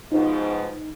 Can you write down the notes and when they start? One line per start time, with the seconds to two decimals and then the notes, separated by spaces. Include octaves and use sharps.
0.12 G#2 B2 F3 D#4